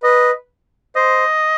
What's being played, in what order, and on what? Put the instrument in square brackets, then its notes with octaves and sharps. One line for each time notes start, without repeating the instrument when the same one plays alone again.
[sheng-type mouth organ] B4 [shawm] D#5
[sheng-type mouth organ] C5 [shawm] D#5